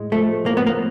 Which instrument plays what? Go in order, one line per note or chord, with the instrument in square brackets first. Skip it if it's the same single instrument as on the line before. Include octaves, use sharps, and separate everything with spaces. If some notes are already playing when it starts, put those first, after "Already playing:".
Already playing: [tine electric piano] A2 G#3
[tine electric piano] F3 [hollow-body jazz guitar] A3
[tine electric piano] A2 [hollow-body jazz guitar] A#3
[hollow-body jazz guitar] B3
A#3